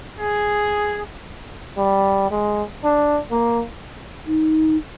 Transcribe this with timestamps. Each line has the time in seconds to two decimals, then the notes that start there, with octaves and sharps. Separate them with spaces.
0.19 G#4
1.77 G3
2.31 G#3
2.84 D4
3.31 A#3
4.26 D#4